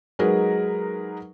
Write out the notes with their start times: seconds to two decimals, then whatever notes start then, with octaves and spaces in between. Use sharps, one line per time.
0.19 F#3 G#3 D#4 G#4 A#4 B4